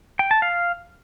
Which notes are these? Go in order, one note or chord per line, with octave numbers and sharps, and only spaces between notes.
G5
A5
F5